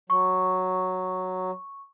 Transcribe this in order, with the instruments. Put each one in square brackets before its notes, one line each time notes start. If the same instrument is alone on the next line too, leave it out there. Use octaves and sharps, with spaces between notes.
[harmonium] F#3 [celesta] C#6